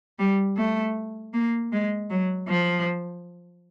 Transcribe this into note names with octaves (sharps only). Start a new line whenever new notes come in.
G3
A3
A#3
G#3
F#3
F3